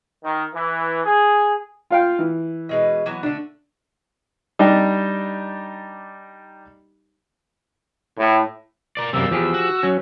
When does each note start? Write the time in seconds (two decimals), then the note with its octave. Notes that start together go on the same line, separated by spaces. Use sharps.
0.23 D#3
0.54 E3
1.04 G#4
1.90 F4 F5 G5
2.19 E3
2.69 B2 G#3 B4
3.06 E3 F#3 B3
3.23 D3 A3 D4
4.59 G3 D4 D#4 G4
8.18 A2
8.97 A#4 D5
9.13 F#2 C3 G3 A#3 E6
9.31 E2 F3 G4 G#4
9.54 F#4
9.83 F#3 C#4